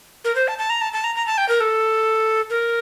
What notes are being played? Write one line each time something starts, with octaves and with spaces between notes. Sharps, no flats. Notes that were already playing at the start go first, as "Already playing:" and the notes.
A#4
C5
A5
A5
A#5
A5
A5
A#5
A#5
A5
G5
A#4
A4
A#4